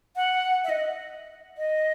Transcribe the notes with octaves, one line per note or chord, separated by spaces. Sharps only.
F#5
E5
D#5
D#5